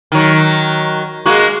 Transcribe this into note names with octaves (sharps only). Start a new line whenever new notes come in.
D#3 F#3
G#3 A#3 F#4